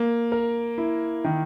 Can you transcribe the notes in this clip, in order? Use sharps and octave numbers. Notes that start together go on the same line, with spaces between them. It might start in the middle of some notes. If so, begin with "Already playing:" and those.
Already playing: A#3
A#4
E4
D#3